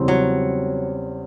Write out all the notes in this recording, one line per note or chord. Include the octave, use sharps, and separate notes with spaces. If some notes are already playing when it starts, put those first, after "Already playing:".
Already playing: E2 C#3 E3 G3 C4
F#3